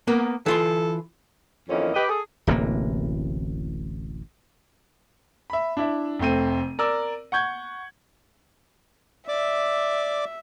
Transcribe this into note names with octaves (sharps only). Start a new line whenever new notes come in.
A#3 B3 A#4
E3 F4 A4 C6
F2 D#3 E3 A#3 C4 C#4
G4 B4 D#5
G#4 A4
D1 A1 C3 A#3
E5 B5
D4 E4 E5
F1 A3 C4 D#7
A#4 D5 E6
F#5 C#6 G6 G#6
D5 E5 D6